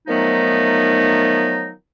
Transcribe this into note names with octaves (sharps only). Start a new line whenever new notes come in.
D#3 F3 F#3 A3 B3 D#4